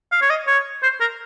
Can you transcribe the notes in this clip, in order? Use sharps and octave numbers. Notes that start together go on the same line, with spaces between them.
F5
C#5
D#5
C#5
C5
A#4